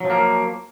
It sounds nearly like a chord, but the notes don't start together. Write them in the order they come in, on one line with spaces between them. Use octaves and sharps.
F#3 F3 A#3